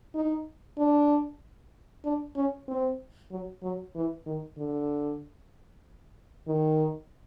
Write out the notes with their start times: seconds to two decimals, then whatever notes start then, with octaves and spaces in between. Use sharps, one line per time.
0.15 D#4
0.78 D4
2.05 D4
2.36 C#4
2.68 C4
3.31 F#3
3.63 F#3
3.95 E3
4.26 D#3
4.58 D3
6.48 D#3